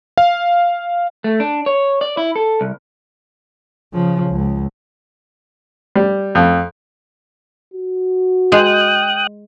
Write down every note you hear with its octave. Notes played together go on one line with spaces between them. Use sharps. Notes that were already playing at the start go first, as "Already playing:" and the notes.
F5
A3
D4
C#5
D5
E4
A4
C2
C#3 F3
C#2
G3
F2
F#4
G#3 G#4 G5 D#6 F#6